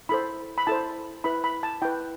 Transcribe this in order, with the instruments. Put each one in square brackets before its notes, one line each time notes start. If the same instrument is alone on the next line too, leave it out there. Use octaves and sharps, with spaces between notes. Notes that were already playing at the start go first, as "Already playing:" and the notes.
[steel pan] E4 A4 C5 B5
B5
E4 A4 C5 A5
E4 B4 B5
B5
A5
E4 B4 G5